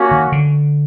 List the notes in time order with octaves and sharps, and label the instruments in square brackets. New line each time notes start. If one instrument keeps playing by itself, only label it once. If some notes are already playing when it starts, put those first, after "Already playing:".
Already playing: [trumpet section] A#3 C#4 F#4
[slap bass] D#3
D3